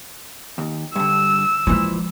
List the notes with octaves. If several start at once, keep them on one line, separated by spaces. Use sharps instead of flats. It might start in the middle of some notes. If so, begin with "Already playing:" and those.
D#2
G2 D3 E6
A#2 E3 F3 G#3